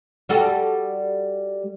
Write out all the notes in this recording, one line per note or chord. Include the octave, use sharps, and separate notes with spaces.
G3 F#4 A4